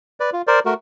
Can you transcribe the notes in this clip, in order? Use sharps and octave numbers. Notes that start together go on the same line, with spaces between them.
B4 D5
F4
A#4 C5 D5
A3 F#4 A#4